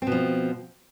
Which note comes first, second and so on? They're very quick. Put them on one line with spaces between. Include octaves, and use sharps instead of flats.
C4 B2 F3